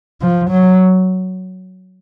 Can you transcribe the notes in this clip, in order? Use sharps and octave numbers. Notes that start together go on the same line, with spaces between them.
F3
F#3